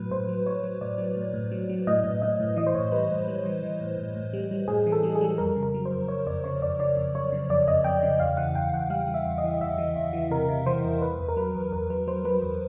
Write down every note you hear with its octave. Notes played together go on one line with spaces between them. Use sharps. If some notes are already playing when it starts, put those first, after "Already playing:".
Already playing: A2 F#3 B4
A2 C5
F#3
A2 C#5
F#3
A2 D5
F#3
A2
A2
F#3
F#3
A2 D#5
A2
A2 D#5
A2
E3 D#5
C5
A2 C#5
G3 B4
A2
G3
E3
E3
A2
A2
A2
G3
G3
A2 G#4
E3
A4
G3
G#4
G3
F2 A#4
C#3
A#4
F#3
C5
F2
F2 C#5
F2 D5
C#3 C#5
F2 D5
C#3 D5
F2
F2 C#5
C#3
F2 D5
F2 D#5
F2 G5
C#3
E2 F5
E3 F#5
E2 G5
E2 F#5
G3 F5
E3
E5
E2
D#5
E3
E2 E5
E3
E2
E3
C3 A#4
C3
E3 C5
E2
E2 B4
E2
A#4
F#3 B4
E2
E2 A#4
F#3 B4
F#3 C5
F#3 B4
E2